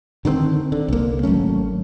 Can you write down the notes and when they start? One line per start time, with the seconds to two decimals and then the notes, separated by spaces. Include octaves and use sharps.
0.25 D3 D#3 A3 C4
0.72 D3
0.88 C2 A#3
1.23 G#1 F#3 A3 C#4